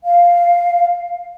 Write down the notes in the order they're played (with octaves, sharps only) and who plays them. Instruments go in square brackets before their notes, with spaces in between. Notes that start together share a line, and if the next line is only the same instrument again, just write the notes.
[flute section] F5